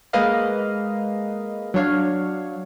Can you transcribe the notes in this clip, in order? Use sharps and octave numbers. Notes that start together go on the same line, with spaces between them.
G#3 A#3 B4 D#5 F5
F#3 D4 C#5 F5